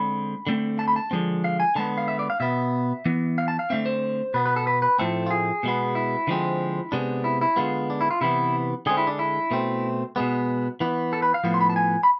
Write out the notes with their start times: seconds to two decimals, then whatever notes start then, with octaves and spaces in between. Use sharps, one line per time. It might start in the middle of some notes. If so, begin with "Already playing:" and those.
Already playing: D3 G#3 C4 B5
0.47 D3 A3 C4
0.79 A5
0.88 B5
0.96 A5
1.11 D3 F3 G#3 C4
1.44 F5
1.60 G#5
1.75 D3 G#3 B3 A5
1.98 F5
2.08 E5
2.19 D5
2.30 F5
2.40 B2 B3 E5
3.05 E3 B3
3.38 F5
3.48 A5
3.59 F5
3.70 D3 A3 C4 E5
3.86 C5
4.34 B2 B3 B4
4.46 B4
4.56 A4
4.67 B4
4.82 B4
4.99 A2 F3 A3 C4 A4
5.26 F4
5.31 G#4
5.63 B2 G#3 B3
5.95 E4
6.27 D3 F3 G#3 C4
6.92 C3 G#3 B3 D4
7.24 E4
7.41 E4
7.56 D3 G#3 B3 F4
7.90 D4
8.01 E4
8.11 F4
8.21 C3 E3 B3 E4
8.86 D3 G#3 C4 G#4
8.97 E4
9.07 D4
9.19 E4
9.51 B2 A3 C4
10.16 B2 G#3 B3
10.80 E3 B3
11.13 A4
11.22 B4
11.34 F5
11.44 A2 F3 B3
11.54 C6
11.61 B5
11.70 A5
11.76 G#5
12.03 B5